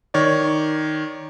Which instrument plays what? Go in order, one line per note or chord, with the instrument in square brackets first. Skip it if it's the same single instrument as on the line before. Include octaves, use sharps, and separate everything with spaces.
[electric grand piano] D#3 C#5 D5